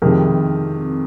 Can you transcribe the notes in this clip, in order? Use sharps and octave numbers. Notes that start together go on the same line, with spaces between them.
F2 C3 D#3 G#3 A#4